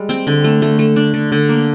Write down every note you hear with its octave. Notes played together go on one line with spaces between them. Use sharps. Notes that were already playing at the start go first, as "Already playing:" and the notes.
Already playing: G3 G#3
C4
D3
A3
A3
A3
D4
D3
D3
A#3